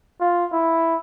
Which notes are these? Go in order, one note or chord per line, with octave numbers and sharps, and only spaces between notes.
F4
E4